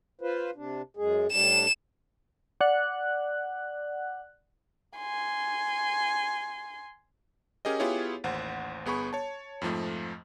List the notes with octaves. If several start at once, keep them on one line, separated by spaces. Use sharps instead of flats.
F4 B4 C5
C3 D4
F#2 G#3 G#4
A2 G3 D4 E7
D5 F#5 F#6
G#5 C6
C#4 G4 G#4 A#4 D#5
B3 E4 F4 G4 G#4 C#5
A1 D#2 C5 F#5
G1 B3 G#4 B5 C#6
C#5 A5
F2 G#2 F3 A3